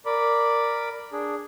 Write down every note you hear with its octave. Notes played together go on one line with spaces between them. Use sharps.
A#4 D5 B5 D6
D4 G#4